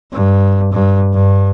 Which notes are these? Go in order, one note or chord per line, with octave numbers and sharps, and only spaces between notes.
G2
G2
G2